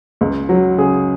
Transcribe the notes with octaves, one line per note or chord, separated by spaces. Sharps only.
C#2
F#3
C#3 G#4